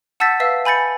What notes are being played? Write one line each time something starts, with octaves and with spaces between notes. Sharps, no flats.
F#5 A5 E6 G6 A6 B6
B4 E5 F5 E6 C7
G#5 B5 G6 A6 C#7